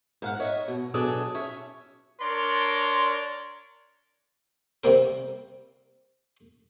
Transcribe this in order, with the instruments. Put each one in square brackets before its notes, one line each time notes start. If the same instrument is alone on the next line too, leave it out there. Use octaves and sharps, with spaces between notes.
[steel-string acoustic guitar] G#2 F5 F#5
C#5 D#5 E5
B2
B2 F#3 D4 G#4 A4
C#4 C#5 E5
[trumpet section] D4 A#4 C#5 D5 C6
[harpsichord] C3 G3 A#3 C4 A#4